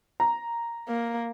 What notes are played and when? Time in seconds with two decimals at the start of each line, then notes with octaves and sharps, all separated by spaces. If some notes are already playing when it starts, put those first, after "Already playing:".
0.20 A#5
0.88 A#3